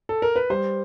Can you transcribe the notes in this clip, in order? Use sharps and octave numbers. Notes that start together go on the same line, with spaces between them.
A4
A#4
B4
G3 C5